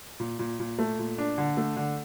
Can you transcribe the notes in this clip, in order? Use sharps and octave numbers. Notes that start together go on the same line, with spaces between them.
A#2
A#2
A#2
A3
A#2
D4
D3
A3
D3